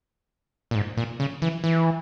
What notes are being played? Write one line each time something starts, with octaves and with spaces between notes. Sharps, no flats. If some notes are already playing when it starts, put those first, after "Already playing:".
A#2
G#2
A#2
C#3
E3
E3